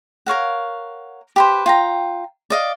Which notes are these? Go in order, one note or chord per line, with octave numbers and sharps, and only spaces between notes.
A#4 C#5 F5 F#5
G4 B4 C5
F4 G5 A#5
D5 D#5 F5